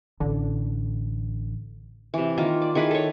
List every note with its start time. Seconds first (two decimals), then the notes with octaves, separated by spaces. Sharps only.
0.20 A1 D3
2.14 C3 E3
2.38 D#3 A#3 F4
2.62 D5
2.75 D#3 E4 G#4 B4
2.91 A4 C#5